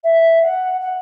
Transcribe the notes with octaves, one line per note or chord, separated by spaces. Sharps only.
E5
F#5
F#5